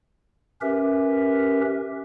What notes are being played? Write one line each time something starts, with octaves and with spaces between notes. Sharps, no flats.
C#4 G4 A#4 B4 E5